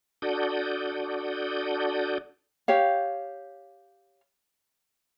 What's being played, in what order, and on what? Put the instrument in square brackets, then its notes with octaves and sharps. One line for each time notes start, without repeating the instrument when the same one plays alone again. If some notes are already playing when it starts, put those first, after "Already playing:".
[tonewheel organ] D4 F#4 A4 D5 D#6 G6
[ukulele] G4 C#5 F5